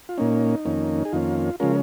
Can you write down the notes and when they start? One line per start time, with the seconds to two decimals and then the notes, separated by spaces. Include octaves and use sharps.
0.09 F4
0.18 A#2 A#3 C#4 D#4
0.65 F2 D#3 A#3 C#4
1.05 G#4
1.12 F2 D#3 A#3 C#4 F4
1.60 C#3 F3 G#3 C#4 F4 A#4